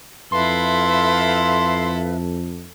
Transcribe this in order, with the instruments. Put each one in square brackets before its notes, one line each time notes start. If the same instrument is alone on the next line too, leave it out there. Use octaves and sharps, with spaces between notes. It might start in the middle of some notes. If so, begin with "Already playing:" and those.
[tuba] F2 [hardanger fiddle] E4 A4 [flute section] B4 E5 F5 [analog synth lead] C6